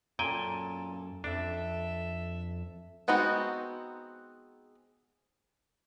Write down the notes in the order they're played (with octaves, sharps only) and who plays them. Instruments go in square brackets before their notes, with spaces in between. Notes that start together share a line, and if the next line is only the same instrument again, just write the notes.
[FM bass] F#2 [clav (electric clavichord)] A#2 G5 G#5 [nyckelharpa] C#4 A4
[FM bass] F2 [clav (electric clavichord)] D4 [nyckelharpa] A4 E5
[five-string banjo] G#3 B3 C4 D#4 F#4